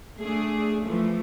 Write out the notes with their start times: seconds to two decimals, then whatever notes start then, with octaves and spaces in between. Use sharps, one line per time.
0.19 A3 D4 G#4
0.84 E3 F3 A3